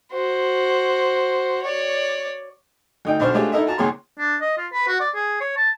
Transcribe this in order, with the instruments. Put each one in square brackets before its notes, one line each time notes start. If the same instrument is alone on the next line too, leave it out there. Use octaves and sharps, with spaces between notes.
[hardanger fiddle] F#4 C5
C#5 D5
[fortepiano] D2 D#4 G5
B1 D4 C5 C#6 F6
G#3 A3 C#4 D4 F4 G4
D#4 E4 A4 A#4 D#5 E5
F4 F#4 A5 A#5
C#2 D#3 A#3 G#4 C#5 C6
[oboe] D4
D#5
F4
B4
F#4
D5
G#4
C#5
A5